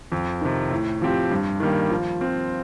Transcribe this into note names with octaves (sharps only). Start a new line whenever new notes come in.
F2
C3 D#3
A2
F3 C4 G4
G2
D#3 G3 A#3
F3
C4 F4